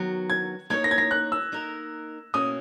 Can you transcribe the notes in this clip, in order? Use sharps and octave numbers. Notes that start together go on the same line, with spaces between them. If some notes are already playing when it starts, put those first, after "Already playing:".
Already playing: D#3 F#3 B3 F#4
G#6
A#3 D#4 A#4 C#5 G#6
A#6
G#6
A#6
F#6
E6
A#3 D#4 A#4
B2 A#3 C#4 D#6